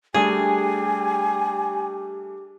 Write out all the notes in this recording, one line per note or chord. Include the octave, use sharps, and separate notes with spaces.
G3 A3 D4 G4 G#4 G#5